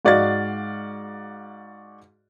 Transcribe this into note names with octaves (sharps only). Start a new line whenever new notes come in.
G#2 F#4 D5 D#5 F5 A6